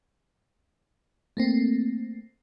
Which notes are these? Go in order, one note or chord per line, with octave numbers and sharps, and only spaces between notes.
A3 A#3 C4